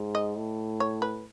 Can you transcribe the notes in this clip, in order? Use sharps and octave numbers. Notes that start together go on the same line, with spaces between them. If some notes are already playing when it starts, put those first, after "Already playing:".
Already playing: G#2
D#5
A2
C#5
B4